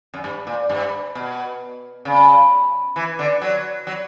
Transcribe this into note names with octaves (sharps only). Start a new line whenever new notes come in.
F#2
G2
A#2
G2
B2
C#3
E3
D3
F#3
F#3